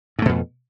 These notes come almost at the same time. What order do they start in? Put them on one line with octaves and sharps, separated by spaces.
G#2 A3 B2 F2